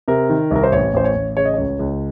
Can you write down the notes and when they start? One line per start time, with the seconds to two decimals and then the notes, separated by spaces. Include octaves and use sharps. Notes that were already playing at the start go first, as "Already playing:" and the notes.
0.08 C3 A#4
0.29 D#3
0.51 C2 A#4
0.63 C5
0.72 A1 C#5
0.94 A1 C5
1.04 C#5
1.15 A1
1.37 C#3 C#5
1.45 D#5
1.54 C#2 C#5
1.79 C#2